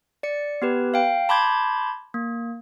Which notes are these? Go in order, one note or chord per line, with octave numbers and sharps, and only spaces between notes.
D5 C#7
B3 G4 B4
F5 G5
A5 B5 C6 D6 G6 G#6
A#3